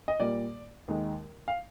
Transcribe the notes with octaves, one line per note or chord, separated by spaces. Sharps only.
D#5
A#2 G3 A#3 D5
D#2 D#3 G#3
F5